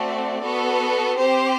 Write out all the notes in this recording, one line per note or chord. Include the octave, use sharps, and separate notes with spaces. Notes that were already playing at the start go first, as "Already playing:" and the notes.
Already playing: A3 C4 F#4 D5
B3 F#4 A4
C4 G4 C5